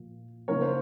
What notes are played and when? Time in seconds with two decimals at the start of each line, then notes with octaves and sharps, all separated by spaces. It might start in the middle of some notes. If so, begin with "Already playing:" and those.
Already playing: A#2 F3 A#3
0.48 C#3 F3 A#3 D#4 A#4 C#5
0.62 C5